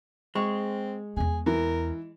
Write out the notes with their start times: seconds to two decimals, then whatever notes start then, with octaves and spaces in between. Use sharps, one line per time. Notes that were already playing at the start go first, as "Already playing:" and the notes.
0.35 G#3 C4 C#6
1.17 E2 B3 G#4
1.46 E3 A#4